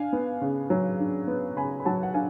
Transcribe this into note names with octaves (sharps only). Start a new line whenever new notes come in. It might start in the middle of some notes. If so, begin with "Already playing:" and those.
Already playing: D4 F5 G#5
B3
C#3
F#3
D4
B3
C#3 G#5 B5
B5
F#3 F#5 A5
F#5
D4 F5 G#5